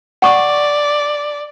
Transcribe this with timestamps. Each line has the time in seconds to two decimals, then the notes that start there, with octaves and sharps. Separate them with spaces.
0.22 D5 F#5 C#6 D6